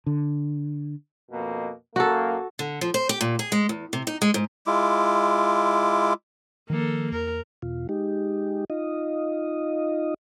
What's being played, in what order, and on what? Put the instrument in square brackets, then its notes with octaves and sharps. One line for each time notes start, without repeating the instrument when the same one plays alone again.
[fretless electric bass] D3
[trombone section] F2 B2 A#3
[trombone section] F#2 A#3 [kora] F#4 A4
[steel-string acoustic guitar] D3
F3
C5
G4
A#2
G#4
G#3
E2
C3
D#4
G#3
G#2
[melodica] G#3 E4 F4 D6
[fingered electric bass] D#3 F3 [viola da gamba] A#3 A4
[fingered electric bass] E2 [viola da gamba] A#4
[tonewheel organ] E2 B2 F4
G#3 D#4 G4
D#4 F4 D#5